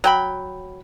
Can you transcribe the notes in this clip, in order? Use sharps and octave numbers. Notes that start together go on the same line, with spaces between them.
F#3 G5 B5